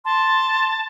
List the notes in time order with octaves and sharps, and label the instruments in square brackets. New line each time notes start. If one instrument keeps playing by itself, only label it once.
[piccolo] A5 [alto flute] C6